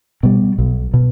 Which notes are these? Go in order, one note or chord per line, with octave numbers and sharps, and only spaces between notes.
B2 G3
B1
B2